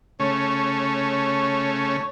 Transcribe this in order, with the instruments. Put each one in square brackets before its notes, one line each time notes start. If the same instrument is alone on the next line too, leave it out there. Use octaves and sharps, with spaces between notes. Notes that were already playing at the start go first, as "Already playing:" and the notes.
[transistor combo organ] C#3 A3 C#4 [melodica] C#5